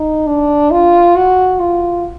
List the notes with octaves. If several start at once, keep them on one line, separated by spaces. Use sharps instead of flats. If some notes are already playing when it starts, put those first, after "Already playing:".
Already playing: D#4
D4
F4
F#4
F4